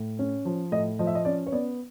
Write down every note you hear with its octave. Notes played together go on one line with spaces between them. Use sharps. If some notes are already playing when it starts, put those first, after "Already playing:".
Already playing: A2
C#4
F3
A2 D#5
F3 D#5
E5
D#5
C#4 D5
C#5
B3 D5